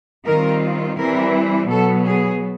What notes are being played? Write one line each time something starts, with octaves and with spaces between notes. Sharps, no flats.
D#3 G3 C4 F4 A#4
E3 G3 C4 E4 A#4
B2 F#3 B3 A4
G#4